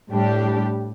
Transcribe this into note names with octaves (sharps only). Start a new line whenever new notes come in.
A2 G3 D4 G4